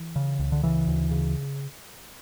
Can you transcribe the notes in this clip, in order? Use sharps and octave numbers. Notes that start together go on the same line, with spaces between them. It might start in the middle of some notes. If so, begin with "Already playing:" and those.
Already playing: E3
C#3
C#2
D3
C#3 E3
D2
C#3